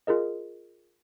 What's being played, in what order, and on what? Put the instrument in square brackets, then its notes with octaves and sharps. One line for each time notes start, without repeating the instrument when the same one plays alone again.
[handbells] F4 G#4 A#4 D#5